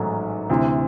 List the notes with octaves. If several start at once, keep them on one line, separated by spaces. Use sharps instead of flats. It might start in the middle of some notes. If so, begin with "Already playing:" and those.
Already playing: A1 G#2 D#3 F#3 A3
D2 C3 E3